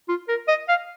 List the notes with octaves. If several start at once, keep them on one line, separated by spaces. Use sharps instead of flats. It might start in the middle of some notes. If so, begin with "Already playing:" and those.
F4
A#4
D#5
F5